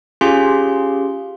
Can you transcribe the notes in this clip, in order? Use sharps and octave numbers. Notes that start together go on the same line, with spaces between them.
C#4 F4 G4 G#4 F5 C6